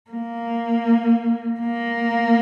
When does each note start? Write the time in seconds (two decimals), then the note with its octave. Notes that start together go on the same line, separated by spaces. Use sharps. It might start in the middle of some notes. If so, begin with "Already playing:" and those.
0.11 A#3
1.61 A#3